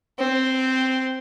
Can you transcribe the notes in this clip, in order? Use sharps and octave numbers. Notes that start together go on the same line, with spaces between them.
C4